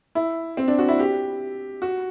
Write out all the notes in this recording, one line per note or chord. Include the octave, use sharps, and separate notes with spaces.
E4
C4
D4
F#4
E4
G4
F#4